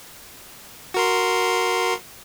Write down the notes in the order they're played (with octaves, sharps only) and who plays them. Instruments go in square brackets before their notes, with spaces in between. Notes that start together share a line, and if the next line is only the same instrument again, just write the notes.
[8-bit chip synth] F#4 A#4 C6